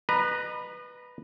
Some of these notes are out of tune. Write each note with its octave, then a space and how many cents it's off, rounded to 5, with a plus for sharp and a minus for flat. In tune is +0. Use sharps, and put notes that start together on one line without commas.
B4 +0 D#5 -35 A#5 +15